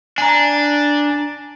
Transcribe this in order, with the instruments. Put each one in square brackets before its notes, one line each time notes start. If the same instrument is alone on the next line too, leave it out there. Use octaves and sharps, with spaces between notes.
[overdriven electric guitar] D4 [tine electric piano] G#5 A#5